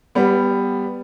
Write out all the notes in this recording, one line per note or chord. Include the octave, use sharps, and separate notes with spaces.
G3 B3